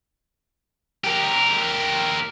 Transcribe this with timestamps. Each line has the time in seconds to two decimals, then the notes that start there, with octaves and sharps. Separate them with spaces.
1.04 G4 A#4